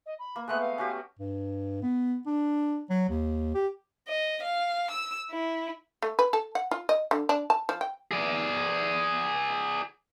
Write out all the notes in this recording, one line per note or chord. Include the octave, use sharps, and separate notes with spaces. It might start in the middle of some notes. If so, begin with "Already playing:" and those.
D#5
B5
A#3
G#3 A3 B3 F#6
F5
C#4 F#4 G4
G2
B3
D4
F#3
D#2
G4
D#5
F5
E6
E4
A3
B4
A4
F#5
F4
D#5
D3
D4
A5
F3
G5
G#4 D5